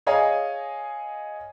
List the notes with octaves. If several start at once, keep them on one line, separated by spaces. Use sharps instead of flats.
G#4 C#5 D#5 F5 G#5